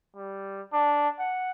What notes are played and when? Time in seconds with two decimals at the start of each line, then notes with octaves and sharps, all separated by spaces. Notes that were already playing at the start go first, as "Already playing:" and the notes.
0.16 G3
0.73 D4
1.19 F#5